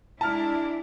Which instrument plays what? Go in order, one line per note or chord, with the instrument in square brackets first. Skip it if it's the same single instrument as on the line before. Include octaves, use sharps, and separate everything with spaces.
[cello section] G#3 D4 E4 [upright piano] A5 F6